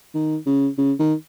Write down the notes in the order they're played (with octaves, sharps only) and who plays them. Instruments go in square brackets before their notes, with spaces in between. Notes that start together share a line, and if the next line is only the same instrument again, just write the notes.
[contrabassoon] D#3
C#3
C#3
D#3